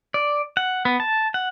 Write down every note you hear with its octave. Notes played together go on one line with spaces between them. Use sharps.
D5
F#5
B3
A5
F#5